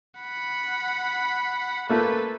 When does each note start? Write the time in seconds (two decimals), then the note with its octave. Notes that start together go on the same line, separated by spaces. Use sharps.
0.20 F#5 B5
1.89 A3 A#3 A4 B4